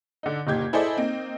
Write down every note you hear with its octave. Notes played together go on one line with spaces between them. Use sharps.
D3 D#4
F#1 A#2 D#4 G4 G6 G#6
E4 G#4 A4 C5 D5 D#5
A#3 C4 D#4